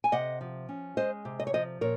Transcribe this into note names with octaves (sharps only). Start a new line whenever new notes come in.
G#5
C3 D#5 F#5
F3
C#4
G#3 C5 D#5
C3
D#5
C#5
F3 C5 D#5
A#2 A#4 C#5